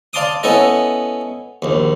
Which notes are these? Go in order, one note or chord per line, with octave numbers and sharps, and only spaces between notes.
D5 F5 A5 C6 D6 D#6
B3 C#4 E4 A4 D#5
A#1 D#2